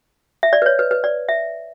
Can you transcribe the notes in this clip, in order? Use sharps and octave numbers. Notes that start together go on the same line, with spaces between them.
E5
D5
B4
C#5
B4
B4
D5
E5